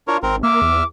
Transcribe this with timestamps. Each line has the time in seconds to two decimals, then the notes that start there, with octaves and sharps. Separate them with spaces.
0.08 D4 F4 A#4 C#5
0.23 G#1 C4 A#4
0.43 A#3 E5 D6 F6
0.62 E2